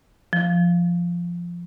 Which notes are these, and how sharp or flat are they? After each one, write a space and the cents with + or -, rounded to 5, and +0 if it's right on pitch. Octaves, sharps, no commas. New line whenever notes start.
F3 -10